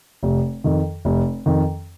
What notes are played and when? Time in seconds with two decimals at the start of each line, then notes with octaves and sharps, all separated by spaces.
0.23 F1
0.64 F2 D#3
1.05 F1
1.46 F2 D#3